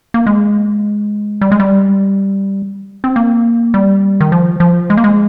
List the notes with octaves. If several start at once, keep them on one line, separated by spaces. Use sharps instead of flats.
A#3
G#3
G3
G#3
G3
C4
A#3
G3
D#3
F3
F3
G#3
A#3
G#3